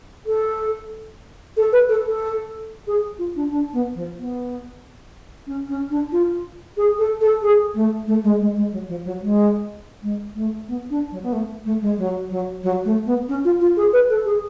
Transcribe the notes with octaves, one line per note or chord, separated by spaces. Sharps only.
A4
A4
B4
A4
A4
G#4
F4
D4
D4
B3
F3
B3
C#4
C#4
D4
F4
G#4
A4
A4
G#4
A3
A3
G#3
G#3
G#3
F#3
F3
F#3
G#3
G#3
A3
B3
D4
F#3
B3
A3
A3
G#3
F#3
F#3
F#3
A3
B3
C#4
F4
F4
G#4
B4
A4
G#4